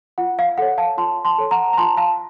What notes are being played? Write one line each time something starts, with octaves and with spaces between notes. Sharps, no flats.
F4 F#5
F5
A4 C#5 F#5
F5 A5
F4 A5 C6
A5 C6
A4 C#5
F#5 A#5
A#5
F4 A5 C6
F5 A5